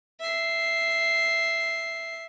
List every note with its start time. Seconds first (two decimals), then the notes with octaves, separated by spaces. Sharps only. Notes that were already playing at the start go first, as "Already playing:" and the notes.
0.21 E5 C7